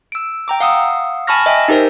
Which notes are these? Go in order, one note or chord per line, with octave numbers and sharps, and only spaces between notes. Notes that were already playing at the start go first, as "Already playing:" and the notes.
E6 D7
G5 A#5 D6
F5 F#5 D#6 E6
G#5 A5 B5 C#6 F6 A#6
D#5 E5 G5 G#5
D#4 G4 A#4 C5